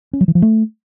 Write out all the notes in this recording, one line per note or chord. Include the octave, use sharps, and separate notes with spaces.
C#4
F#3
E3
F3
A3